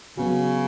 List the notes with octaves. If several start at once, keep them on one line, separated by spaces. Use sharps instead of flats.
C#3 F#3 B3 F#4